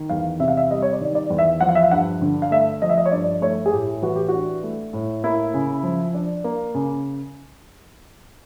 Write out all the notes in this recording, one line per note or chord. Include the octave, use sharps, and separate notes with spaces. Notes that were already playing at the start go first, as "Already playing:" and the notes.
Already playing: D#3
E2 F5
C3 E5
F5
E5
G3 D#5
C#5
D5
D#3
D5
E2
E5
F3 F#5
F5
E5
F5
G2 F#5
D3
F5
A3 E5
F3 D#5
E5
D#5
C#5
G2 D5
A3 C#5
G#4
A2 G4
E3 F#4
G4
D4 F#4
A3
A2
A#3 E4
C#3
F3
D4
A#3
C#3